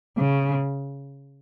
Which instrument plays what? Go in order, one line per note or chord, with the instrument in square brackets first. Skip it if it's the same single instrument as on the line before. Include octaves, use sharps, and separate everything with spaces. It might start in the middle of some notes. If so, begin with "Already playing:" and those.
[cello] C#3